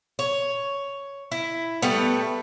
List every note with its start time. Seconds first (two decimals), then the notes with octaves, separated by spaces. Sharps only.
0.19 C#5
1.32 E4
1.82 G3 A3 B3